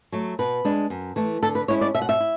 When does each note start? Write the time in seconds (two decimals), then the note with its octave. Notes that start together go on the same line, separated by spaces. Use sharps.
0.12 F#3 A3
0.39 B2 B4
0.65 G#3 D4
0.90 F#2
1.16 E3 A3
1.42 D3 A4
1.55 B4
1.68 G#3 C#4 E4 C#5
1.81 D5
1.94 B2 E5
2.02 F#5
2.09 E5
2.20 E4